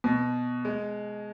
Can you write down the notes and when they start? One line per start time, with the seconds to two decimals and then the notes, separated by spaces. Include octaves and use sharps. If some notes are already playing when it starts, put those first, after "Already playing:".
0.04 B2
0.65 G#3